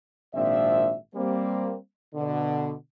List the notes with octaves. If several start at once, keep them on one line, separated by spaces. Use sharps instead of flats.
G#1 A#2 F3 C4 D4 E5
G3 A#3 C4
B2 D3